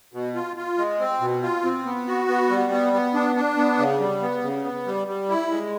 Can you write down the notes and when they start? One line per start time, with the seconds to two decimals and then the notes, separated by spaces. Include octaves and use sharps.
0.14 B2
0.35 F4
0.57 F4
0.78 G#3
1.00 C4
1.21 B2
1.42 F4
1.64 C4
1.85 B3
2.08 F#4
2.28 B3
2.50 G3
2.72 B3
2.93 B3
3.14 D4
3.36 D4
3.57 B3
3.78 C#3
4.00 G3
4.22 B3
4.43 C#3
4.64 B3
4.86 G3
5.08 G3
5.29 E4
5.51 G#3